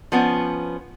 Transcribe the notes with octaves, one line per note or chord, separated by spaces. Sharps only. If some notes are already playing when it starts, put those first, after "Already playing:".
F3 B3 C#4